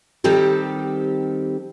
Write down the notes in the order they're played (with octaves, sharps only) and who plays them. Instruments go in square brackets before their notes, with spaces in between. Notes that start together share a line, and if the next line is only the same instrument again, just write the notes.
[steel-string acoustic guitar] D#3 G3 C4 G4 A4